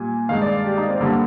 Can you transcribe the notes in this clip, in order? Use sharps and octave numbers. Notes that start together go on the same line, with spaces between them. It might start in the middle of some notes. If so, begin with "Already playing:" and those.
Already playing: A#2 G3 G#5
G2 D#3 G#3 F5
D5
G4
D#4
C4
G2 D3 G3 A#3